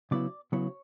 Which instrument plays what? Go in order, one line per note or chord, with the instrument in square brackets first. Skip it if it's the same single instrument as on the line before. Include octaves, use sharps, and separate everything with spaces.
[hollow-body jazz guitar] C#3 F#3 B3 E4 D5
C#3 F#3 B3 E4 C#5